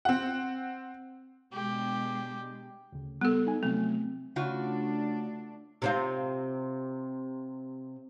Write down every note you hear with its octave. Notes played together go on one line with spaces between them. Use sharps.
C4 F#5
B2 G#3 D4 G4
D2 C#3
G3 B3 A4
D#4 G#5
C3 F#3 A3 C4
C#3 A3 D4 F4 F#4
C3 C4 F4